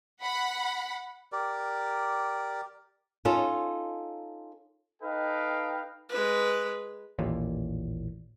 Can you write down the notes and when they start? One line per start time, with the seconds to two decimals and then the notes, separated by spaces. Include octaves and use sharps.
0.21 F#5 B5
1.32 G4 A#4 D5
3.25 C#4 D#4 F4 A4
5.02 D#4 A4 B4 D#5 F5 G5
6.09 G#3 B4
7.19 A1 D#2 A#2